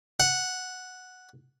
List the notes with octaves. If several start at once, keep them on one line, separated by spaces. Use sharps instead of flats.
F#5